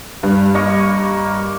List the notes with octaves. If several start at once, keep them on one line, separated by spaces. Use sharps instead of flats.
G2
A#3 D#5 C#6